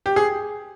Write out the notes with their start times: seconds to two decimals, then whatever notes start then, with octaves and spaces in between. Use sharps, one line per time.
0.06 G4
0.16 G#4